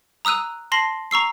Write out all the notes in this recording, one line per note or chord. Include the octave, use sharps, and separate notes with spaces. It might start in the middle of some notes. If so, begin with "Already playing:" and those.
A#5 D#6 E6 F#6 D#7
A5 C6 A#6 C7 F#7
A#5 C#6 E6 C7